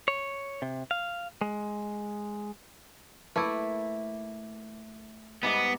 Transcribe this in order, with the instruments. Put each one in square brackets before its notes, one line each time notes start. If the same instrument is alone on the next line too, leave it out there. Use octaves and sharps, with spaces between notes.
[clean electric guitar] C#5
C3
F5
G#3
[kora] A3 E4 [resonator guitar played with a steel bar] A#3 B4
[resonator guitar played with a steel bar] G#2 G3 D#5 [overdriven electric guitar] B3